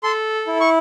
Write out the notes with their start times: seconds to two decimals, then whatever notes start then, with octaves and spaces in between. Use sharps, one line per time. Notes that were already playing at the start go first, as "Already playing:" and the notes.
0.03 A4 C6
0.47 E4
0.61 C#6